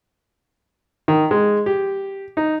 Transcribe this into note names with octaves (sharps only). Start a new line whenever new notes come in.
D#3
G#3
G4
D#4